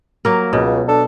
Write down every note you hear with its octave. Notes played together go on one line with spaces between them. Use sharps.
F#3 A#3 A#4
C#2 B2
D4 A4